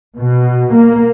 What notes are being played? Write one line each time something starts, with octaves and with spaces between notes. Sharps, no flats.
B2
A#3